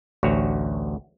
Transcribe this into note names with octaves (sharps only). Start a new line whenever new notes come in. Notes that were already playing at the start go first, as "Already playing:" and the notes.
A1 D2 F#4 C#5